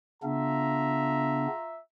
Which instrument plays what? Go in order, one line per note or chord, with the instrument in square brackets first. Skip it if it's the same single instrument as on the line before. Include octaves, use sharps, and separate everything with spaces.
[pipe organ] C#3 B3 D4 [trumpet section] F4 E5 A#5